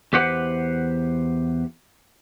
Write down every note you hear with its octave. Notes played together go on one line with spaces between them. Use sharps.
E2 G4 B4 C5 F#5